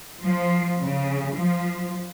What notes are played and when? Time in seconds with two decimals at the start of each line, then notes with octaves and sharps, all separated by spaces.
0.23 F3
0.82 C#3
1.34 F3